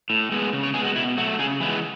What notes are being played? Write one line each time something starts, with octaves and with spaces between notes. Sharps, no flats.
A2
G#3 B3
C#3
C#5
G#3 B3 G#4
F#4
B2 E4
F#3 A3 F#4
C#3 G#4
E3 G#3 B3 E4